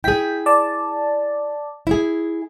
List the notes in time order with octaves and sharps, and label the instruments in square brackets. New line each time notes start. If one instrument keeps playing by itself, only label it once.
[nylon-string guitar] E4 G#4 [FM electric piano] G5 B6
[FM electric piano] D5 A5
[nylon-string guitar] E4 G#4